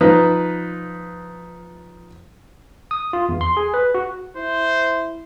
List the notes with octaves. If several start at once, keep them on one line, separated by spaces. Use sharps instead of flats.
F3 D#4 B4
D#6
F4
E2
C6
G#4
B4
F#4
E4 C5